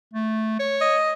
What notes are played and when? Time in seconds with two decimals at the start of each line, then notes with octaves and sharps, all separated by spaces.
0.14 A3
0.60 C#5
0.81 D#5